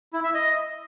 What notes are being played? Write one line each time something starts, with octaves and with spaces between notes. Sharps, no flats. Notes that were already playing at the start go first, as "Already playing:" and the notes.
E4
E5
D#5